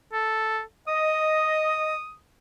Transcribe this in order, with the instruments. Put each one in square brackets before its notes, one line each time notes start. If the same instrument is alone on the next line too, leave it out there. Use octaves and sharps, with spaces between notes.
[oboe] A4
[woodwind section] D#5 [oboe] D#6